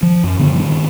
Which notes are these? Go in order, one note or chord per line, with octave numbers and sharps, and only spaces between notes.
F3
F#2
A#2 D3 B3
G2 D#3